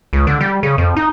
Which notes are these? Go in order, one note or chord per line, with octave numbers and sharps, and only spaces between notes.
C#2
D3
G3
C#3
F2
D#4